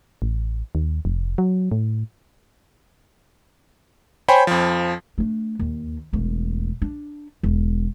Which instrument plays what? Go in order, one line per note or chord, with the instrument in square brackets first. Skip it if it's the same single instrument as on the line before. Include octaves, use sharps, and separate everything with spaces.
[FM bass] A1
D#2
F1
F#3
A2
[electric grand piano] C5 C#5 G5 G#5 B5
F2 F3
[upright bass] A3 D4
D#2
E1 A3
D4
E1